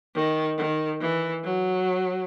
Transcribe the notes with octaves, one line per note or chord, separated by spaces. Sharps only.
D#3
D#3
E3
F#3